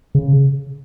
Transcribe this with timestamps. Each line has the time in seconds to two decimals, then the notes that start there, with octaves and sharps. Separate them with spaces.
0.15 C#3